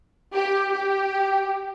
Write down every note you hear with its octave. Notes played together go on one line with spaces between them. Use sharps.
G4
G4